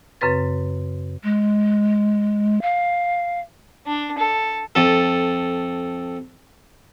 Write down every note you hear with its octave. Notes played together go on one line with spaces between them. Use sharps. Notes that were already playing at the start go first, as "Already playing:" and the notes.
F#2 C#3 C4 B4 A6
G#3
F5
D4
A4
F2 A4